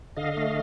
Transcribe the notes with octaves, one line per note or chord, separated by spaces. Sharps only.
D3 D#5 F5
A3